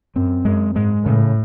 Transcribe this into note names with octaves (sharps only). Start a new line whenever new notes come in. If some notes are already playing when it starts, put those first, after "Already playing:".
F#2 C4
F#2 G#3
G#2 G#3
A2 C#3